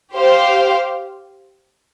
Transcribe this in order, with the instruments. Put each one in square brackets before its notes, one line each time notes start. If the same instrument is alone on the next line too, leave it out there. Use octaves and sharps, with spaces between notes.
[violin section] G4 C5 F5